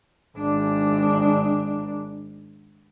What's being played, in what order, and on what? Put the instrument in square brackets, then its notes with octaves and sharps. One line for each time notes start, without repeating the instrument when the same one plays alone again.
[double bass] G#1 D4